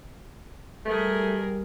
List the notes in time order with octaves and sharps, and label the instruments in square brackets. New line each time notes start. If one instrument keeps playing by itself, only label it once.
[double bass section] G3 [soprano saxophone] A3 [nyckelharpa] G#4 A#4